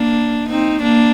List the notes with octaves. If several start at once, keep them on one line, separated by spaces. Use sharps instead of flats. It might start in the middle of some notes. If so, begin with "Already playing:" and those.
Already playing: A#3 D4
C4 D#4
A#3 D4